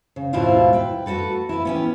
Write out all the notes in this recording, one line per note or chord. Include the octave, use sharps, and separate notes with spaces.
C#3
D#2 G#2 B2 E4 F4 F5
B4 G5
A3 F#4 G4 A4 B4
E4 B4
B3 C#4 G4